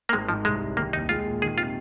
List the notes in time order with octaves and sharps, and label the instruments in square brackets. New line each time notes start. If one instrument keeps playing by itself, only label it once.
[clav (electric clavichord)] A#3
[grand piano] G#1 [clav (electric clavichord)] G#3
[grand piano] G#2 [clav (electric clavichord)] F3
[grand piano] C2 [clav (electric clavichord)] G#3
[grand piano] C2
[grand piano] D#3 [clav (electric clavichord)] A#3
[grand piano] D#2 [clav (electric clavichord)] D#4
[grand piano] G#3 [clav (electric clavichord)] F4
[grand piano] A#2
[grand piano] D#3 [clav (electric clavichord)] G#4
[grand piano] C3 [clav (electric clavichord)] F4